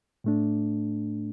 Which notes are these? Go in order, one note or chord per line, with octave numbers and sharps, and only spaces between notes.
A2 A3 D4